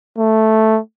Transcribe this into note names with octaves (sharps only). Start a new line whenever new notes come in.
A3